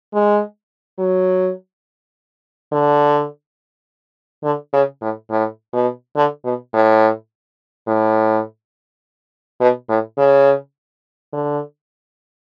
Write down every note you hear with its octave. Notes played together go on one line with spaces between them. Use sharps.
G#3
F#3
D3
D3
C#3
A2
A2
B2
D3
B2
A2
A2
B2
A2
C#3
D3